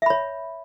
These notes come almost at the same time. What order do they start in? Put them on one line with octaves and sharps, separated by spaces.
E5 B5 C#5